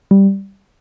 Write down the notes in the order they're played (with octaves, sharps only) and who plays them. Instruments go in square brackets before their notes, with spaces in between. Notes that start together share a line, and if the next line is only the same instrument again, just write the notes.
[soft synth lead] G3